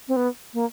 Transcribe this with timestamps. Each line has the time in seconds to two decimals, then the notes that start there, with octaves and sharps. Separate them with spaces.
0.08 C4
0.16 B3
0.54 A#3